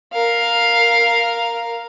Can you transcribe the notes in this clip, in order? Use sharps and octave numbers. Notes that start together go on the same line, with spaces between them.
A#4 F5